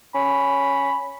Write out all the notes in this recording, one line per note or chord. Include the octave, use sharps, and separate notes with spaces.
C#4 B5